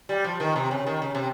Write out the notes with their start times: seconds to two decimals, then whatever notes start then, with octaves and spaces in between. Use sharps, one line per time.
0.09 G3
0.24 F3
0.40 D#3
0.56 C3
0.71 C#3
0.86 D#3
1.02 C#3
1.15 C3